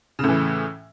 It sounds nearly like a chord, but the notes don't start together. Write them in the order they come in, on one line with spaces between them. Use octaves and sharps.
C#3 A2 E3